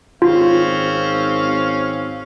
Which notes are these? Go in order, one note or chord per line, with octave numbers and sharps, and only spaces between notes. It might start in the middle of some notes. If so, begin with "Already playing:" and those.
G#1 C4 C#4 F4 F5